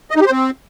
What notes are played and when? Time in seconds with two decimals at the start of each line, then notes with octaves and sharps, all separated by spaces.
0.11 D#5
0.16 D#4
0.21 G4
0.26 C5
0.31 C4